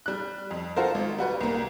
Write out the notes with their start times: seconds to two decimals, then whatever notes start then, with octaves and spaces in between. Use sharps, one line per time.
0.06 G3 F#6
0.51 F2
0.76 F4 F#4 A4 A#4 C5
0.95 G#1
1.18 G3 F#4 B4
1.41 C2 A#3